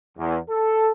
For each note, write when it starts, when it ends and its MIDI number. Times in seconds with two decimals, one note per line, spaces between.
0.18 0.38 40
0.50 0.90 69